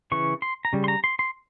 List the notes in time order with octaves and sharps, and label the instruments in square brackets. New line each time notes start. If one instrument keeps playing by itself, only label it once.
[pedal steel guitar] C#3 E3 C#6
C6
A#5
C#3 G3
C6
A#5
C6
C6